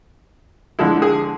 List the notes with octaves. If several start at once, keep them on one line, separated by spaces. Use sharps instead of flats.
D3 F3 G#3 E4
G#4